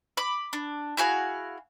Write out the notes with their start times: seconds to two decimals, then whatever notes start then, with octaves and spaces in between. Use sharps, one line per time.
0.17 B5 D6
0.53 D4
0.97 E4 F#4 G#4 F5